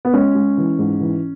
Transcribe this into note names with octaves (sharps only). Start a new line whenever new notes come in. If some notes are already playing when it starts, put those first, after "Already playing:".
B3
G#3 C#4
G#3
E3
G#2
E3